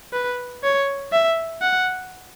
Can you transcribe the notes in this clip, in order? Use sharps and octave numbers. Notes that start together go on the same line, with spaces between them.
B4
C#5
E5
F#5